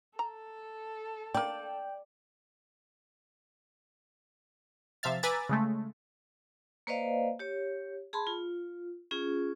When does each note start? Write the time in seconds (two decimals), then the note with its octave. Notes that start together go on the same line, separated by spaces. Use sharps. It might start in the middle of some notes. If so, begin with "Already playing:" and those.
0.19 A4 A#5
1.34 A#3 D4 D5 G5
5.03 C3 F3 E5 F5 A6
5.23 B4 G#5 A#5 D6 E6 A6
5.49 C#3 G#3 A3
6.87 A#3 B4 C5 D5 D#5 F5
7.39 G4 C#5
8.13 G#4 A5 B5 C6
8.27 F4
9.11 C#4 F4 G#4